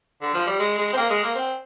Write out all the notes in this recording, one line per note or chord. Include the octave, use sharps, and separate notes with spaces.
D3
F3
G3
G#3
G#3
C4
A#3
G#3
A#3
C4